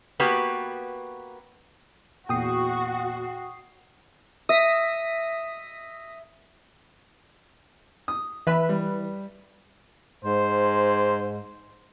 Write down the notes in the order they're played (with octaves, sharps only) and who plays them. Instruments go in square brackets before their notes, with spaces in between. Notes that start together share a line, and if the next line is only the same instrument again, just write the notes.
[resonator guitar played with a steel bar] A#3 B3 F#4 G4 B4
[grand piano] E2 A#2 [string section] F#4 [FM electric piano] G5 D#6 C7
[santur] E5 [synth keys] D#6 A#6 B6
[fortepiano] D#6
[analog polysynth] E3 B4 [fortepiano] E5 B5
[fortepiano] G3
[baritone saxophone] G#2 [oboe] C5